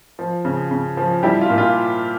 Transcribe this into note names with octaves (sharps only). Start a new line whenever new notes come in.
F3
C#3
C#3
F3
G3 E4 G4
F4
A#2
F4